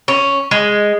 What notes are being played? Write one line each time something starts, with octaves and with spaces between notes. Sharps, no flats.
C#4
G#3